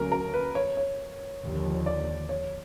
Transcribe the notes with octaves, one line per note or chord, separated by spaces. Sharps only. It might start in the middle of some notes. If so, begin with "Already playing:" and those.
Already playing: D2 D3 F#3 A#3 C#4 A#4
A#4
B4
C#5
C#5
D#2 D3 F3
D5
C#5